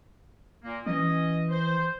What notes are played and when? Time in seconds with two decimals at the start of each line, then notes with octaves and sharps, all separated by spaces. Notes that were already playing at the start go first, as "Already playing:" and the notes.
0.64 A#2 A#3
0.86 E3 C#4 D#5
1.50 C5